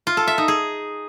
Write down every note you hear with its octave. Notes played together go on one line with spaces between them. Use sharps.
F4
A4
E5
D#4
G#4